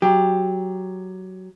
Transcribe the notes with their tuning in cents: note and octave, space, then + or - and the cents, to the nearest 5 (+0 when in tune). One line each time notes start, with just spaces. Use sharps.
F#3 +10 G4 +15